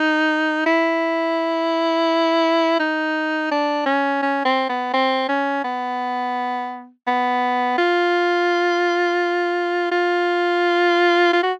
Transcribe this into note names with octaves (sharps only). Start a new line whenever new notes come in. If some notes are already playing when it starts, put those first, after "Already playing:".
Already playing: D#4
E4
D#4
D4
C#4
C#4
C4
B3
C4
C#4
B3
B3
F4
F4
F4
F#4